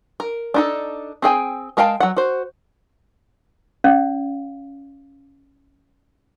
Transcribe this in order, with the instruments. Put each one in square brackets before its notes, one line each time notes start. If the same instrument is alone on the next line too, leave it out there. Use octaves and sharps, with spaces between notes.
[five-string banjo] A#4
D4 D#4 A4
C4 G#4 G5 G#5
G#3 A#4 F5 G5 A5
F#3 F#5
F#4 C5
[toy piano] C#4 D5 F5